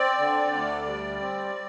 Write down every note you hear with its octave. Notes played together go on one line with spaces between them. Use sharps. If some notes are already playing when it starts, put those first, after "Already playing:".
Already playing: C4 D5
D3
D2
G3
C4